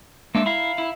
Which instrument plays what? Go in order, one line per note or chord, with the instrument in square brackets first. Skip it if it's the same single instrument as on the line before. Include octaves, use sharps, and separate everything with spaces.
[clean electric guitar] G#3 E5 [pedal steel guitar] A#3 D4
[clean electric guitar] E4 [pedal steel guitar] F5 A#5 B5
[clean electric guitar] E4